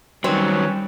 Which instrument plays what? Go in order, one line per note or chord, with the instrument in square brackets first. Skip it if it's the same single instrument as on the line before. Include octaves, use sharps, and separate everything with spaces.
[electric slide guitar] D#3 F#3 [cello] G3 [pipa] C4 [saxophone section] C#4 B4 C#5